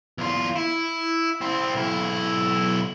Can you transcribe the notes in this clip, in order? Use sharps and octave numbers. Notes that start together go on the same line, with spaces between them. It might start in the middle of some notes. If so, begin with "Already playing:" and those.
E2 F4
E4
C4 E4
B1 E4